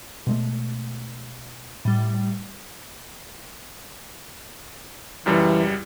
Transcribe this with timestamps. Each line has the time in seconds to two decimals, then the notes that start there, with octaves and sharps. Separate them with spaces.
0.27 B2 G#3 A3
1.85 A2 G3
5.26 C#2 F#2 E3 G3